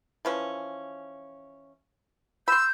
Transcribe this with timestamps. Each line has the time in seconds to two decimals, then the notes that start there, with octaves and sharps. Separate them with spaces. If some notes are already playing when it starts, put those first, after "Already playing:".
0.25 E3 F3 C#4
2.48 B5 C6 E6 G6